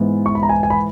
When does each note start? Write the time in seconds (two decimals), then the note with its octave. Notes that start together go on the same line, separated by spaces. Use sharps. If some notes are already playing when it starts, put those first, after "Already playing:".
Already playing: G#2 E3 B3
0.26 C#6
0.35 B5
0.43 A#5
0.49 G#5
0.63 G#5
0.70 B5